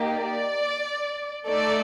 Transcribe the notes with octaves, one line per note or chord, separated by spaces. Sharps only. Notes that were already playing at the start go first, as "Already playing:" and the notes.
Already playing: A#3 D#4 G4
D5
A3 D#4 A4 D5